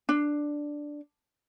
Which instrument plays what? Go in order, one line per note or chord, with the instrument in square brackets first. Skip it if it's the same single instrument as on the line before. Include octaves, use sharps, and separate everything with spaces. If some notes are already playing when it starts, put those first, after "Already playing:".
[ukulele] D4